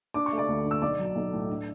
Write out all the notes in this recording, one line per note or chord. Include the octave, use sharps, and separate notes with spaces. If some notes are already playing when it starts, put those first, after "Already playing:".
D4 D6
C#6
A3
D5 D6
D2
D3
E6
B1 D5 D6
F#3
B1
A2
D4